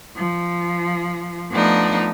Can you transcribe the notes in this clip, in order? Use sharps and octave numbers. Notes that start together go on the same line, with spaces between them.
F3
F3 A3 B3 D4 D#4